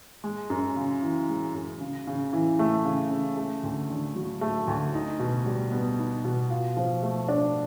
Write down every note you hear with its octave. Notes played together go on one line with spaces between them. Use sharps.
G#3
F#2
C#3
E3
G#3
F#2
C#3
C#3
E3
A3
C#3
C#3
A3
D2
D3
F#3
A3
D2
D#4
B2
G3
B3
D#4
B2
F4
F3
A3
D4